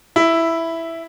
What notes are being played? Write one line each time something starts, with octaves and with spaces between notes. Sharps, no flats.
E4